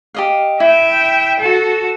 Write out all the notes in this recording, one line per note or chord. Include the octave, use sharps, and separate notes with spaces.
G4 D#5 F5
E4 E5 G5
F#4 A4